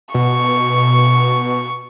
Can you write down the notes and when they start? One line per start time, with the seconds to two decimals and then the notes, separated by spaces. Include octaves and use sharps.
0.14 B2 C#6